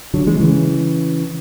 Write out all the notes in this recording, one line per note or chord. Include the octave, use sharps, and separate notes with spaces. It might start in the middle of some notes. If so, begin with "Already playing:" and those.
D3 F#3
E3 G#3
C#3 E3